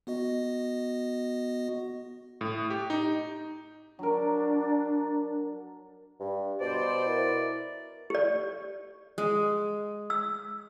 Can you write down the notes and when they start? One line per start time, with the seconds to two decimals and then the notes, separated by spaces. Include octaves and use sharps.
0.07 B3 F#4 D#5
2.41 A2
2.70 G4
2.90 D#4
3.99 F#3 D4 A#4
6.20 G2
6.61 B2 C5 D5
7.06 E4 A#4
8.10 G4 D5
9.18 G#3
10.10 E6